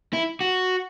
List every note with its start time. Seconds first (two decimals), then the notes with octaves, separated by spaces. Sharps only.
0.13 E4
0.41 F#4